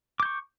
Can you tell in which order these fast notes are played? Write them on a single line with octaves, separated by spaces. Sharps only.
D6 G6 C#6